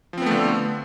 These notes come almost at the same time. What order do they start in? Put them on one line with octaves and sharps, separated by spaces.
F3 C4 B3 A3 D3